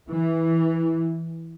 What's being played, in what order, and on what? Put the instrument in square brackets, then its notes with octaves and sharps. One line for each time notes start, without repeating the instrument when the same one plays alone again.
[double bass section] E3